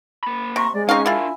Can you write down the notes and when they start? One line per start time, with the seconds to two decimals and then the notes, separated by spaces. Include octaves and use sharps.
0.24 A#3 B5
0.56 C3 A#5 C6 C#6
0.74 G#3 D5
0.89 C4 C#4 D#4 F5 A#5 C#6
1.06 D4 E4 F4 A#4 E5 G#5